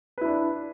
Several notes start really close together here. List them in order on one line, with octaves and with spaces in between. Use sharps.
B4 E4 D4